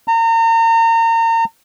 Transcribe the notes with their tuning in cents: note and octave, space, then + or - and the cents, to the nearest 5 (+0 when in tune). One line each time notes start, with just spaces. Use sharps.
A#5 -35